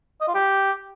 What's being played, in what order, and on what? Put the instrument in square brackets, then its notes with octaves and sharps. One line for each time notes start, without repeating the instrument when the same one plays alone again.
[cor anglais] D#5
F4
G4